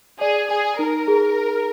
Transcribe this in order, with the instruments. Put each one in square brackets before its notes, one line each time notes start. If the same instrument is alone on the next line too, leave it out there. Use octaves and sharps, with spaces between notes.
[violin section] G#4 [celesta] D5
[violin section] G#4 [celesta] G#5
[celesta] D#4 [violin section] A#4
[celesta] G#4